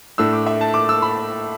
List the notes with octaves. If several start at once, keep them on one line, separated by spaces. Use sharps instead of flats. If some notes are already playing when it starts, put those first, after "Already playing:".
A2 A3 D4 E6
D6
E5
A5
D6
E6
B5